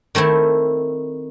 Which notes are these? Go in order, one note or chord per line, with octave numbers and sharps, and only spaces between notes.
D#3 A3 C4 E4